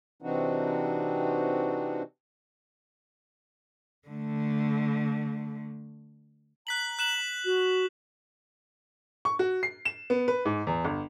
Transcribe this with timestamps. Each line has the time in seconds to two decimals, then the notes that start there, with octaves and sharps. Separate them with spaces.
0.22 C3 E3 C4 D4 D#4 F#4
4.08 D3 A3
6.67 A#5 F#6 B6 F#7
6.99 F#6 E7 F#7
7.44 F#4
9.25 C#6
9.39 F#4
9.63 C7
9.85 E7
10.10 B3
10.28 B4
10.45 G#2
10.67 E2
10.85 G1